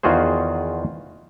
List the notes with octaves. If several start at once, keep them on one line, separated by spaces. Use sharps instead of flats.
E2 D#3 F4 F#4 G#4 C5